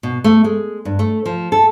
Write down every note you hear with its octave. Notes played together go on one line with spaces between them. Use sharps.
B2
A3
G#3
G2
A3
F3
A4